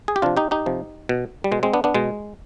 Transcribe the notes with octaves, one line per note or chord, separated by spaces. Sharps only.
G#4
G4
C3 F3 D4 F4
D#4 G4
D#4 G4
C3 F3
B2
G3
B2 G#3
G#3 C4
B3 D4
B3 D4
B2 G#3